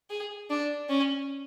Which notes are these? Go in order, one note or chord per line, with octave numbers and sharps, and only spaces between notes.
G#4
D4
C#4